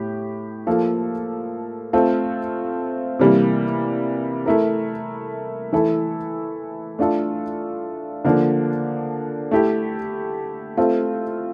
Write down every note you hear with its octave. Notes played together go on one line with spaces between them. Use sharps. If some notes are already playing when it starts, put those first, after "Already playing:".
Already playing: A2 G4
F3 A#3 F4 A4
A3 C4 F4 A4
C3 E3 G3 A#3
A3 E4 A#4
E3 A3 E4 A4
A3 D4 F4 A4
D3 F3 A#3 D4
A3 E4 G4
A3 C4 F4 A4